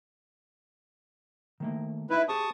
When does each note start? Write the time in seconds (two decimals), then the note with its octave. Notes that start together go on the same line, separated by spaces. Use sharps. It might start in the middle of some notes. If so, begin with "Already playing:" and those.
1.60 D#3 A3 A#3
2.10 D#4 E4 B4 E5
2.29 G4 G#4 C5 A5 C#6 D#6